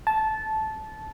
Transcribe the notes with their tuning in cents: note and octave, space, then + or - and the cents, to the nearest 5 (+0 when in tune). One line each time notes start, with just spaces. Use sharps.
A5 -15